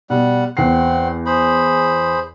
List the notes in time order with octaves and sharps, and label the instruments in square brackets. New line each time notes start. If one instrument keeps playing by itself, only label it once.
[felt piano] B2 [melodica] G3 F#5
[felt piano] E2 C7 [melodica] C4 F#5
[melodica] G#4 C5 B5